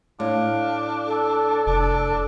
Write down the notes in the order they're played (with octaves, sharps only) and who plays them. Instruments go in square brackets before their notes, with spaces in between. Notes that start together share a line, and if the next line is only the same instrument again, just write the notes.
[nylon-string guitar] A2 [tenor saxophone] D4 [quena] F5
[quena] A4
[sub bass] F1 [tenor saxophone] D4